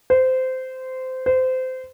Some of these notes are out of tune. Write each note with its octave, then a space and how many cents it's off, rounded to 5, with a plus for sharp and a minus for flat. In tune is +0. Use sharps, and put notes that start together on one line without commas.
C5 -20
C5 -25